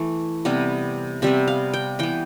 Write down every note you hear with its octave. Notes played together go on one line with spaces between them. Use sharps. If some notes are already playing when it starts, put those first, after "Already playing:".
Already playing: E3 A3
C3 G3 B3
C3 G3 B3 E5
F5
G5
E3 B3 G5